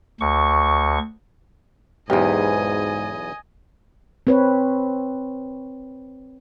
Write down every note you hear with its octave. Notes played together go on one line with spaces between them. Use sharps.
D2 C#6
B1 E2 G#2 G4 A#4 D#5 G5 G#5
C4 B4 C#5